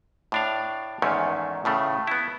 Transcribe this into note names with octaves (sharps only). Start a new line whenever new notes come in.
A2 D4 F5
E2 G#2 D#3 A3 C#4
A2 C#3 A3
B3 E4